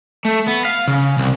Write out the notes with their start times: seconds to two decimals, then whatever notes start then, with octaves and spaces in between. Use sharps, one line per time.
0.25 A3
0.47 B3
0.65 F5
0.88 C#3
1.18 C2